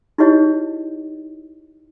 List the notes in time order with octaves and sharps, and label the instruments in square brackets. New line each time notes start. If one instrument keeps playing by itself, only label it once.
[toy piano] D#4 E4 F#4 G4 C#5 D#5